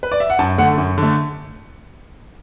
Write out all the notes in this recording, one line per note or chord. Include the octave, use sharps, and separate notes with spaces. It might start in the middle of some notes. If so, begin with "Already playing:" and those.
B4
D5
E5
F#5
F#2 A5
D3 A3 F#5
F#2
D3
A3